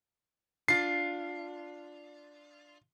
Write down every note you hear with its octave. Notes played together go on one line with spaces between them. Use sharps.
D4 F4 C7